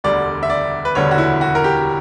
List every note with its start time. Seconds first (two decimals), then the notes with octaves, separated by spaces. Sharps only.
0.04 E1 D2 D3 G3 D5
0.43 E5
0.50 D5
0.85 B4
0.95 E1 D2 D3 G3 C#5
1.11 F#4
1.18 E4
1.41 F#4
1.55 A#4
1.64 G4